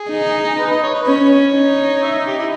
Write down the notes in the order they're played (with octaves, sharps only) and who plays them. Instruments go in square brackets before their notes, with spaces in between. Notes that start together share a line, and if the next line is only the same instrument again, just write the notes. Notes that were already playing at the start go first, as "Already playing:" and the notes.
Already playing: [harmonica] G#4
[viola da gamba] D#4
[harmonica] B4
D#5
C#5
B4
[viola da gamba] C#4 [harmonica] C#5
[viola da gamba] D#4
[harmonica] E5
G4
E4